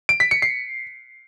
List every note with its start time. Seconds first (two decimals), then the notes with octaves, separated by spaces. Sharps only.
0.09 D7
0.20 B6
0.31 C#7
0.42 C7